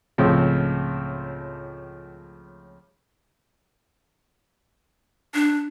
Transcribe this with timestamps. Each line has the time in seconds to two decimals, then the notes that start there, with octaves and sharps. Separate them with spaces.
0.18 C#2 A2 F3 C4
5.34 D4